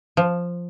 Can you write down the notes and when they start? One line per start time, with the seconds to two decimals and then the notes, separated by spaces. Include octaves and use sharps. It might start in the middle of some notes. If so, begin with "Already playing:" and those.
0.17 F3